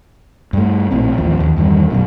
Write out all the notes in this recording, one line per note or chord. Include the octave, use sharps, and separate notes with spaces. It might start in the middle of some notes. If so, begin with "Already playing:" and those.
G2 A3
A#1 A2 C4
A1 D#2 F3
D#2
E2 G2 D#3 G3
B1 F#2 B2